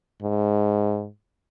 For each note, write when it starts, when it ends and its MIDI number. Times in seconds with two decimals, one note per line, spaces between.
0.22 1.08 44